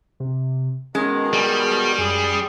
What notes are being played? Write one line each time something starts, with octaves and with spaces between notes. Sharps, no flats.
C3
B2 D#3 G#3 C#4
G3 G#4
F#2 G#4